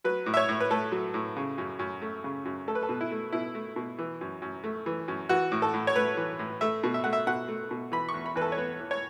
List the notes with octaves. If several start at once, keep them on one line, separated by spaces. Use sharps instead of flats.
F#3 B4
A2
E5
C#5
A2
B4
A3 A4
F#3
A2
C#3
F#2
F#2
A3
C#3
F#2
A3 A4
B4
A4
B2
E4
A3
B2 E4
A3
B2
E3
F#2
F#2
A3
E3
F#2
E3 F#4
A2
A4
A2
C#5
A3 B4
E3
A2
A3 E5
B2
E5
A3 F#5
E5
B2 F#5
A3
B2
E3 B5
C#6
E2
B5
E2 B4
A4
C#5
B3 B4
E3
C#5